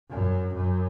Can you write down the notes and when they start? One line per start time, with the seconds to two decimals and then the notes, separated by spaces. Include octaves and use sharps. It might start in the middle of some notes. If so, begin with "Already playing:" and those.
0.10 F#2
0.55 F#2